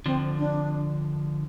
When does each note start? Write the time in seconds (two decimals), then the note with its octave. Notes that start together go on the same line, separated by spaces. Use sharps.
0.06 D3 F3 C4
0.39 D4